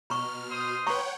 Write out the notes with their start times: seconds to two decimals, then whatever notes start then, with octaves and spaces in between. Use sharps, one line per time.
0.10 B2 A#5 C#6 F6
0.50 C5 C6 D#6
0.87 B4 C#5 F#5 G5 A#5 C#6